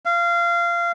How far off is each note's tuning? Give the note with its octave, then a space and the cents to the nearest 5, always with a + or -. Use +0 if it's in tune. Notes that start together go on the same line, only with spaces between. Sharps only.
F5 -20